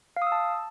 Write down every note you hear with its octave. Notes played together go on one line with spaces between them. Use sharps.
F5
D#6
E6
A5